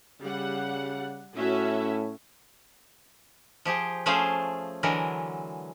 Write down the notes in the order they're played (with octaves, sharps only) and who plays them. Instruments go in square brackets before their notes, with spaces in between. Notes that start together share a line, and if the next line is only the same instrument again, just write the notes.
[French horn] C#3 [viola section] G3 F#5
[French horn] A2 [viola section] C#4 F#4 E5
[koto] F3 G4 G#4
F3 A3 C#4 G#4 C5 F5
D3 E3 F#3 G#3 A#4